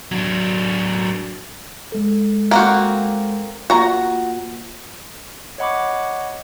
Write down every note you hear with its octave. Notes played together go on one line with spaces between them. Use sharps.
F#3 D4
G#3 A4
A#3 C4 F#4
A#3 F4 F#4 A#5
C#5 D#5 F#5 B5 C#6 D6